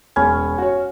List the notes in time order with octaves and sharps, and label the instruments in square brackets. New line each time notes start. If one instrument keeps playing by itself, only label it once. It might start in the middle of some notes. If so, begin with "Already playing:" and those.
[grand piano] E1 B5 G#6 [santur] C#4
[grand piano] F#4 C#5